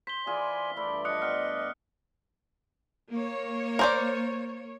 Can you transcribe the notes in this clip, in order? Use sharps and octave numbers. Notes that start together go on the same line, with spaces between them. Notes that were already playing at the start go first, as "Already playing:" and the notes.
C5 B6 G7
E3 F4 G#4 D5 G#5
G2 A3 E4 D5 B5
F3 D4 D#5 D#6 F#6 C#7
B3 F6 C#7
A#3 C#5
A#4 C5 D5